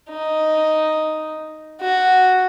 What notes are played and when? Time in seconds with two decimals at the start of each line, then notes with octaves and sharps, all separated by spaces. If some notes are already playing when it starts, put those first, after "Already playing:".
0.10 D#4
1.81 F#4